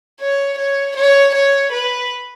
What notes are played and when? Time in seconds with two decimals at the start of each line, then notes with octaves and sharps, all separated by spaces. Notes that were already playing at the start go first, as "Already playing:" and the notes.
0.20 C#5
0.58 C#5
0.96 C#5
1.34 C#5
1.72 B4